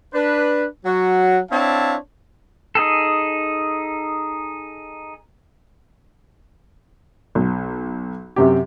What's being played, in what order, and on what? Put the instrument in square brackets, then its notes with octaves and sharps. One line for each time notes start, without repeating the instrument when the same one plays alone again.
[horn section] D4 B4
F#3 F#4
C4 D4 E4 C#5 F5 A5
[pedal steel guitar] D#4 G#4 A4
[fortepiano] B1
F#2 C3 G4